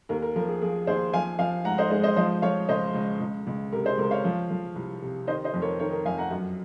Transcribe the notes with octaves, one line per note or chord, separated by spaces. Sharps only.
D#2 A#4
A#4
F3 A#4
G#4
F3 G#4
D#2 G#4 C5
F3 F5 G#5
F3 F5 G#5
G#2 F#5 A#5
C5 D#5
G#2 G#4 C5
C5 D#5
F3 C5 D#5
F3 C#5 F5
C#2 C5 D#5
C#2
C#2
C#2
C3 A#4
G#4 C5
C#2 A#4
C#5 F5
F3
F3
C2
C3
D#3 C5 D#5
C5 D#5
F2
A#4 C#5
D#3 A#4 C#5
A#4
F2 F5 G#5
F#5 A#5
F#2